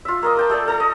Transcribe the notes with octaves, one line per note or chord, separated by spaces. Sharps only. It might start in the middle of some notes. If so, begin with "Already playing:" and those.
F4 E5
A#3 A#4 D#5
A#4 G5 A5
A3 A4 D5
A4 A#5
D#5